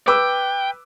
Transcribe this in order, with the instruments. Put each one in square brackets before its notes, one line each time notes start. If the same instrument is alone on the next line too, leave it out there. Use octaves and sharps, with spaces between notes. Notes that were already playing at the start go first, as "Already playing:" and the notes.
[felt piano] B4 D6 E6 [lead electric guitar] G5